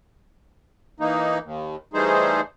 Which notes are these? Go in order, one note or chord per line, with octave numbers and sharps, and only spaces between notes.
E3 A#3 D#4
D#2
E3 G3 A3 D#4 G#4 C5